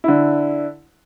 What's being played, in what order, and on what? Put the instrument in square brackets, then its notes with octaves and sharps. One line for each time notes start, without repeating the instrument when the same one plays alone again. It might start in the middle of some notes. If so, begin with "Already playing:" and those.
[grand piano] D3 E4